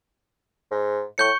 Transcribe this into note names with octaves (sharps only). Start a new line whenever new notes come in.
G#2
A2 C#6 G6 C#7